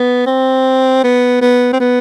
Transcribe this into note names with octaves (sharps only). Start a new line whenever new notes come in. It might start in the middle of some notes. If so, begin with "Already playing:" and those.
Already playing: B3
C4
B3
B3
C4
B3